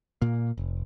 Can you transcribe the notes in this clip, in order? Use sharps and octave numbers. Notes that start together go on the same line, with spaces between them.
A#2 A#3
F1